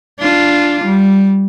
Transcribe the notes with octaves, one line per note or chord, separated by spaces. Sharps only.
D4 F4
G3